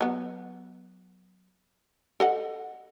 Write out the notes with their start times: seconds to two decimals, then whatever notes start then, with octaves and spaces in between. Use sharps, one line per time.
0.01 F#3 B3
2.20 A4 D#5 F#5